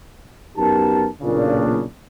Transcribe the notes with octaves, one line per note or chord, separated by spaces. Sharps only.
F#2 B3 D#4 G4 A#4 A5
B1 A#2 C#3 D4